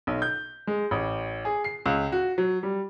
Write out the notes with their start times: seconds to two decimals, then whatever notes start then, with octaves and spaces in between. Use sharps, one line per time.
0.07 B1
0.22 G6
0.67 G#3
0.91 A1
1.45 G#4
1.64 C7
1.86 C#2
2.12 F#4
2.38 F#3
2.63 G3